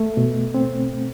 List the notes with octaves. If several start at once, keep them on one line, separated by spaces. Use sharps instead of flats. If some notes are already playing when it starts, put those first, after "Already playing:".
Already playing: A3
B2
C4